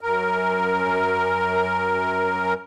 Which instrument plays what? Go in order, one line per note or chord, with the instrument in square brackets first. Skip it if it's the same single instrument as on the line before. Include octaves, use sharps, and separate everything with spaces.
[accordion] F#2 A#4